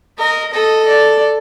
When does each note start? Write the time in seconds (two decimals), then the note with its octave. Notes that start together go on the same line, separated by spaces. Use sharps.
0.18 A#4 D#5
0.53 A4 D#5
0.88 D5